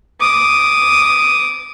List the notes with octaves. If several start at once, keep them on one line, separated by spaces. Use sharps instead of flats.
D6 D#6